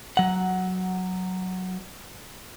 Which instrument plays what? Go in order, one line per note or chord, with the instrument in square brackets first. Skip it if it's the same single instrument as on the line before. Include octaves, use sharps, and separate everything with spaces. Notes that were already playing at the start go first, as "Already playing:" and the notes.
[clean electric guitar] F#3 F#5